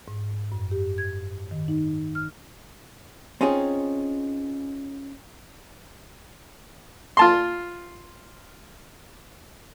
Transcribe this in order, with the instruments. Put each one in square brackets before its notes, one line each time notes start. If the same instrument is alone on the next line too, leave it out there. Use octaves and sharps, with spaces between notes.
[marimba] G#2
F#2
G4
G#6
D#3
D#4
F6
[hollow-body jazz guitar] C4 C#4 D#4 F4 G#4
[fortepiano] F4 A5 C6